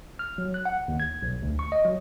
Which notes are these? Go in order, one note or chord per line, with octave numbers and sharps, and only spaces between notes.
F6
F#3
F#6
F#5
D#2
G#6
B1
D2
C#6
D#5
F#3